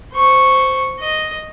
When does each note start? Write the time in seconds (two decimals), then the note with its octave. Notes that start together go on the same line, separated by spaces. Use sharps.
0.14 C5 C#6
1.00 D#5